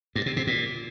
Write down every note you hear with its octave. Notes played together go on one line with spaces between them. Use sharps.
G2
C3
C3
A#2